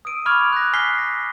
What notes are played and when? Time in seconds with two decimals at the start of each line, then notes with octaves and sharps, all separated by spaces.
0.05 D#6 E6 D7 D#7
0.26 B5 C#6 D6 F6 G#6 F7
0.53 F#6 A#6
0.73 G#5 F6 G6 B6 C7 G7
0.99 A#6